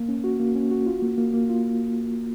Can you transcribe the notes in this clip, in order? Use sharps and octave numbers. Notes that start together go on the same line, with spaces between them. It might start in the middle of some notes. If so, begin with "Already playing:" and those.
Already playing: A#3
C#4
F#4
A#3
C#4
F#4
F4
A#3
A#3
A#3
F4